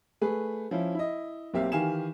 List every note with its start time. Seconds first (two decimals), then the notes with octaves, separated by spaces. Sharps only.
0.22 A3 G#4 B4
0.71 F3 C#4 E4
0.95 E4 D#5
1.54 B1 A#3 C4 G4 E5 F5
1.72 D#3 E3 G4 F5 G#5 E7